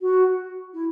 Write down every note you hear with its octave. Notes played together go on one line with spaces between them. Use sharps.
F#4
E4